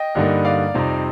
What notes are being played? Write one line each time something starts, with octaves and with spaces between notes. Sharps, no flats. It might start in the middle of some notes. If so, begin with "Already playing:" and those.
Already playing: D#5 G5
G2 D3 G3 A#3 D#4
D5 F5
F2 C3 G3 C4 D#4